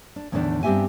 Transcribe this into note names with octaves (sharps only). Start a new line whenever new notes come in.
D4
E2 A2 D3 D#3 B3 D4
G2 B3 C4 G4 E5 G#5